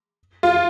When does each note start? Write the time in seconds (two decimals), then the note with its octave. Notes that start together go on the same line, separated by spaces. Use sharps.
0.43 F4